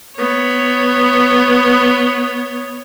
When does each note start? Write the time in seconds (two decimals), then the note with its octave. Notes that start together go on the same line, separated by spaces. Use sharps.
0.17 B3 C#5